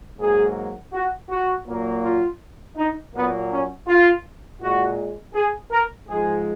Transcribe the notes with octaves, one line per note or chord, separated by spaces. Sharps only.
G#2 F#3 A#3 G#4
F#4
F#4
A#2 F#3 A#3
F4
D#4
A#2 F#3 A#3 B3
C#4
F4
A#2 G#3 F#4
G#4
A#4
G#2 F3 G#3 G#4